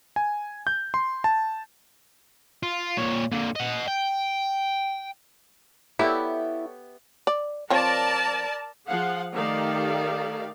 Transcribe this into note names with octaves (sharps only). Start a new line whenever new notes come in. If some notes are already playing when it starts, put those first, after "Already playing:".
G#5
G6
C6
A5
F4
A#2 C#5
A#2 D3
D#5 F#5
G5
B3 E4 G4 A4 C#5 D5 E5
D5
F3 C4 A#4 C#5 D5 A5
F3 G#4 F5 F#5
D#3 A3 G4 A#4 D5 F5